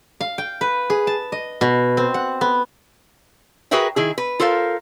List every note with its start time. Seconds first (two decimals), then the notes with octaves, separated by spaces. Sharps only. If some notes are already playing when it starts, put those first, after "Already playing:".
0.21 F5
0.38 G5
0.61 B4
0.90 G#4
1.07 A5
1.32 D#5
1.61 B2
1.97 C4
2.14 F#5
2.41 B3
3.71 F#4 G#4 A#4 B4 E5 G5
3.96 D#3 E4 G#4
4.18 B4
4.40 F4 A4 A#4 C5 F5